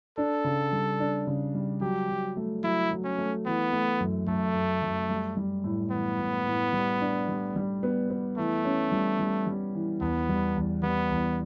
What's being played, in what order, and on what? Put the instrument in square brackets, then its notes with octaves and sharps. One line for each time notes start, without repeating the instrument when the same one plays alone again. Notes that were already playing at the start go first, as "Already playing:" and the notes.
[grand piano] D4 [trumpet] A4
[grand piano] C#3
G3
D4
C#3
G3
[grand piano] F#3 [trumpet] G4
[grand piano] F#3
A3
[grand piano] F#3 [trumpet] E4
[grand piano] F#3
[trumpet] C#4
[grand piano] A3
[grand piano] E3 [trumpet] B3
[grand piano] A3
F#2
[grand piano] F#2 [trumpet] A3
[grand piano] F#2
F#2
G3
G3
A2
[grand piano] E3 [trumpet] B3
[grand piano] A2
A2
G3
D4
G3
G3
B3
B3
[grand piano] E3 [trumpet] A3
[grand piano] C#4
G3
G3
G3
E3
[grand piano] E2 [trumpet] B3
[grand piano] G3
E2
[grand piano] G3 [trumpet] B3
[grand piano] E2